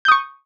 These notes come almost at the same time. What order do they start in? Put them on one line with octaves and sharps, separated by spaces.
G6 D#6 C#6